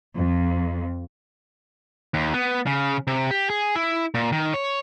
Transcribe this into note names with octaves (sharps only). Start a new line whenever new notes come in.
F2
D#2
B3
C#3
C3
G4
G#4
E4
A#2
D#3
C#5